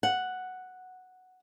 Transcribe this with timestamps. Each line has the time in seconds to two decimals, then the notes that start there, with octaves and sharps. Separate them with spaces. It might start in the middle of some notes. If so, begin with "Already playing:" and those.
0.03 F#5